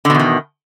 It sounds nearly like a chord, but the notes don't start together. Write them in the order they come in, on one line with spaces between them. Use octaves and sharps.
D3 B2 E2 D#3